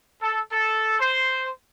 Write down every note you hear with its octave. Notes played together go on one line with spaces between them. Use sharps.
A4
A4
C5